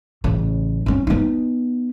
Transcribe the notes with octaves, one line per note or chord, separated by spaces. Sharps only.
A1 C#3
C4 C#4
B3 D#4